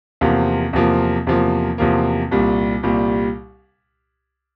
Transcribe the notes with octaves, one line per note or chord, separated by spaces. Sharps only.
E2 C3 F3 A#3
E2 C3 F3 A#3
E2 C3 F3 A#3
E2 C3 F3 A#3
C2 A#2 G3
C2 A#2 G3